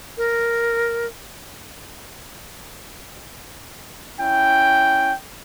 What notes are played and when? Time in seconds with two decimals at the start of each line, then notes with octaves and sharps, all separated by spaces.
0.17 A#4
4.19 C#4 E4 G5